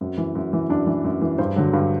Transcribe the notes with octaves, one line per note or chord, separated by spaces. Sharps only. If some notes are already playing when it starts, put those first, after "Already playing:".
F#2 C4
E3
F#2
E3
F#2 D4
E3
F#2
E3
G2 C5
D3 F#3
G2